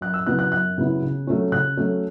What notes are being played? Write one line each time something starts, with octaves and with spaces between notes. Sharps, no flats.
F#2 F#6
E6
C#3 F#3 B3 E4 F#6
F#6
F#2 F#6
C#3 F#3 B3 E4
C#3
F#3 A3 C#4
C#3 F#6
F#3 A3 C#4